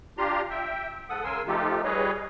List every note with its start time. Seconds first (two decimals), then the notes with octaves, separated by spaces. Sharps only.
0.18 D4 F4 G4 A#5 C6
0.50 E5 G5
1.09 G#2 A4 F#5 D#6
1.24 C#3 A#4 G#5 C6 E6
1.47 F3 A3 D#4 F4 G4 A4
1.84 G3 G#4 B4 C#5 D#5